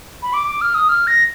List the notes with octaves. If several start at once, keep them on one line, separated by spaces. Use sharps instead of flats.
B5
D6
D6
F6
D#6
F6
A#6